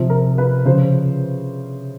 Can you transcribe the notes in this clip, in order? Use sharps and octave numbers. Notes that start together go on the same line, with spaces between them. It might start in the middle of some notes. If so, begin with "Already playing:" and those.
Already playing: C3 F3
A#4
B4
C#3 F3 C5